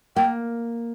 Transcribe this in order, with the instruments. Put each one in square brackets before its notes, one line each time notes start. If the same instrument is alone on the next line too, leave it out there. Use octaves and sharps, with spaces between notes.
[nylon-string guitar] A#3 [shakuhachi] G5